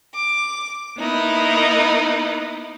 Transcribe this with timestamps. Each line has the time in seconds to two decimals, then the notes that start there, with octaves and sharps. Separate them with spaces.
0.13 D6
0.98 A#3 B3 D#4 E4